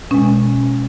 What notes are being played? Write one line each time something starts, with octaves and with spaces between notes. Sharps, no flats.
B2 G#3 C#4